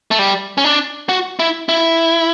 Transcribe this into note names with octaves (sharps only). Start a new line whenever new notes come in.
A3
G3
C#4
D4
F#4
E4
E4